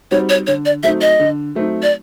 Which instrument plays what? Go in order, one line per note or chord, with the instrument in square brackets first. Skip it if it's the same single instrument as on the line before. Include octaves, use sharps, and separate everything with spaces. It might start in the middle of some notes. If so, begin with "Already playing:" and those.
[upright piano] G3 C4 D#4 F#4 [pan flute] C#5
[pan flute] C#5
[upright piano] D3 [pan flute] C#5
[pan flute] D5
[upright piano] F#3 A3 C4 D#4 [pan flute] E5
[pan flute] D#5
[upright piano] D3
F#3 A3 C4 D#4
[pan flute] D5